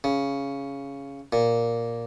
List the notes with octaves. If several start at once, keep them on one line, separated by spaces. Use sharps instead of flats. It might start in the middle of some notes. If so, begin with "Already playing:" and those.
C#3
A#2